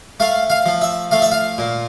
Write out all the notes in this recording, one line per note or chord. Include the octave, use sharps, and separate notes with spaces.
A3 F5
F5
F3
E5
A3 F5
E5
F5
A#2